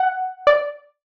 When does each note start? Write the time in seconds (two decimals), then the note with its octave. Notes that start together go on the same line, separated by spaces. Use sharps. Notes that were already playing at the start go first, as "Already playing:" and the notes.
Already playing: F#5
0.47 D5